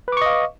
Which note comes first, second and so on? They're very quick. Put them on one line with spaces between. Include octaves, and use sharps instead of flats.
B4 D6 C#6 D#5 F5